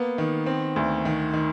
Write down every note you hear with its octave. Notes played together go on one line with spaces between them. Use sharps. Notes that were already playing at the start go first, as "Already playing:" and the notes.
Already playing: A#3 B3
D#3
C4
D2
D#3
D#3